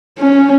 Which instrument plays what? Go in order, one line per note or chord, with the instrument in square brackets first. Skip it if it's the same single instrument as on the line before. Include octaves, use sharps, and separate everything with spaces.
[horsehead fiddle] C#4